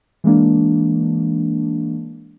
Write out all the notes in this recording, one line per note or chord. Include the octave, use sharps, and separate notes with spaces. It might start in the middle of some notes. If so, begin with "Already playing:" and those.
E3 G#3 A#3 D4